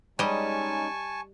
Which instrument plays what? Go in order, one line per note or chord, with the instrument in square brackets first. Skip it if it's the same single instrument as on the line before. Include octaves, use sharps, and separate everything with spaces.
[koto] G3 D#5 [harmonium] G#3 C#4 D#4 [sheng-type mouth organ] G#5 A5 C#6